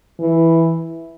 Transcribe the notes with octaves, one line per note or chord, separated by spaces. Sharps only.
E3